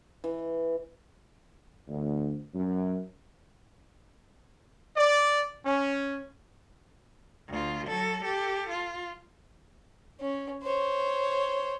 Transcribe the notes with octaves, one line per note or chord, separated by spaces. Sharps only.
E3
D2
F#2
D5
C#4
D2 F4
F#3 A4
G4 A4
F4
C#4
C5 C#5